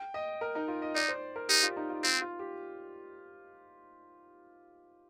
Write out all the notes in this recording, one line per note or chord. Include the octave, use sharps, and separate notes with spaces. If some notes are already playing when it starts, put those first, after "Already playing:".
Already playing: G5
D#5
A#4
D#4
F4
D#5
D#4 D5
C5
A#4
D#4 G4
F4
D#4
F4
C4 F4
F4
G4